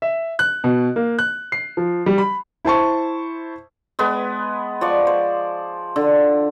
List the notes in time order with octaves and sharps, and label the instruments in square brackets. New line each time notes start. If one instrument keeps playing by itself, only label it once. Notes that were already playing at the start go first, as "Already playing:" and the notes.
[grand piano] E5
F#6
B2
A#3
F#6
C7
F3
G3
B5
[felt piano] E4 C5 A5 C#6
[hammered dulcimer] G#3 B3 B4
F3 D5 C#6
C5
D3